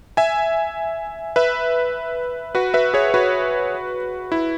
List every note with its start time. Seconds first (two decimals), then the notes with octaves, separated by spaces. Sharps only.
0.17 E5 G#5
1.36 B4 E5
2.55 F#4 B4
2.74 B4 E5
2.94 G#4 C#5
3.14 F#4 B4
4.32 E4